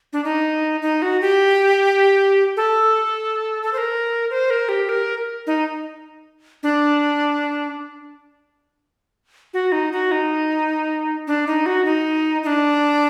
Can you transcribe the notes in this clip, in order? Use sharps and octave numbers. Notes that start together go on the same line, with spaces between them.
D4
D#4
D#4
F#4
G4
A4
A4
C5
A#4
C5
A#4
G4
A#4
D#4
D4
F#4
D#4
F#4
D#4
D4
D#4
F#4
D#4
D#4
D4